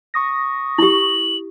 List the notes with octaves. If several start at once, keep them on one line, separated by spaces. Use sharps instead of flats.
C#6 D#6 A#6
E4 G4 F#7